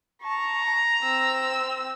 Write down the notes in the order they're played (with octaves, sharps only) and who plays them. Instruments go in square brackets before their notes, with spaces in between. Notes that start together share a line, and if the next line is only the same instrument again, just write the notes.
[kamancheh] A5 C#6 [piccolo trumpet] A#5
[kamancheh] C4 E6